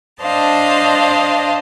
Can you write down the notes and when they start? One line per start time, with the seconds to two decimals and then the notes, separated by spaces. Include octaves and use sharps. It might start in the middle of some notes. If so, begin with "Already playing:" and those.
0.22 D4 C5 D#5 F5 A5